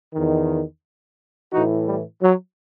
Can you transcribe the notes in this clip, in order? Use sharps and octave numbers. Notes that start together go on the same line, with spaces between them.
E2 D#3
A2 E3 D#4 F#4
G3
F#3